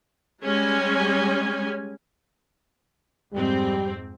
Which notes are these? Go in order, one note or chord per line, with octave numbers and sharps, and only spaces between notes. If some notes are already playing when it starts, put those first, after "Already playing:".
G3 G#3 C#4 G#5
F2 G#2 G3 C4